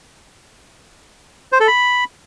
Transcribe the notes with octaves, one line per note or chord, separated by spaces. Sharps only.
C5
A4
B5